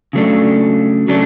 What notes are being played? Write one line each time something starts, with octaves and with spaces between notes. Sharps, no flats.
C#3 F#3 A3 D4
C#3 F#3 A3 D4